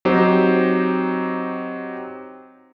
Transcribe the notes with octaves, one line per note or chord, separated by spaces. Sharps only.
F#3 C4 D#4 G4 C5